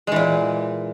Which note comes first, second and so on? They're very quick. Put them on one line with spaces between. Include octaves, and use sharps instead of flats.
G#3 E3 A#2